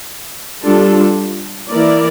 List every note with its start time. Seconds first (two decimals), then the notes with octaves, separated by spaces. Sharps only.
0.64 G3 D4 F4 A4
1.70 E3 A#3 E4 A#4 D5